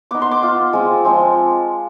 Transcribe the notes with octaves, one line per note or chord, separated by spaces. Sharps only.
B3 D#4 D6
C6
D6
B3 F4
G#3 C4 F4
F3 G#3 C4